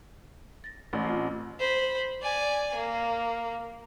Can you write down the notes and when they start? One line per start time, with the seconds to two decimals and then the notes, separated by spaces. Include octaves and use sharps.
0.64 A6 A#6
0.93 A1
1.05 A3 C4 F4
1.60 C5 B5
2.22 D5 G#5
2.75 A#3